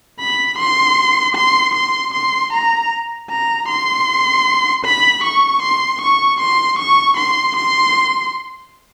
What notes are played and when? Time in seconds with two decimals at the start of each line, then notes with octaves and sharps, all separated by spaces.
0.20 B5
0.58 C6
1.36 C6
1.75 C6
2.14 C6
2.53 A#5
3.30 A#5
3.69 C6
4.85 B5
5.24 C#6
5.63 C6
6.02 C#6
6.40 C6
6.79 C#6
7.17 C6
7.57 C6